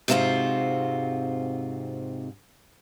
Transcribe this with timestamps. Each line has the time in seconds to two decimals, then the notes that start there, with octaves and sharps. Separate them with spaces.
0.08 G#2 C3 C4 D4 F4 F#4